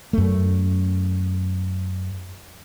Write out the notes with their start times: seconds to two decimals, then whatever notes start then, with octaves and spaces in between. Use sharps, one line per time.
0.13 F#2 A3